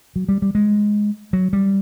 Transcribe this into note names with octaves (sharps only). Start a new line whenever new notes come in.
F#3
G3
G3
G#3
F#3
G3